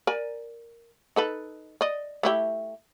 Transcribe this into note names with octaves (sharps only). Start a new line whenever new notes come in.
A#4 D5 G#5
D#4 A4 B4
D5 D#5
A3 E4 G4